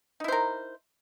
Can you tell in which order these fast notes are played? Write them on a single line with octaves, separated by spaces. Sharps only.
D#4 E4 C5 A#4